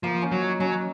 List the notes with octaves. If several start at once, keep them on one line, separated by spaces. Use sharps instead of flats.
F3 A#3
C#4
F#3
D#4
F#3 C#4